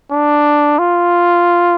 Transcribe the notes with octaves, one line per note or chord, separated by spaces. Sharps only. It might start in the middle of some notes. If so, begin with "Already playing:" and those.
D4
F4